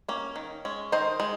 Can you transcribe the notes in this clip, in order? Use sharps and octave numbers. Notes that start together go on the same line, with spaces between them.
A#3 C#4
D#3
G#3 C#4
D#3 C5 D#5
G#3